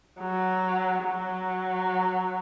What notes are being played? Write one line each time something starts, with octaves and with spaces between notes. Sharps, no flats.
F#3
F#3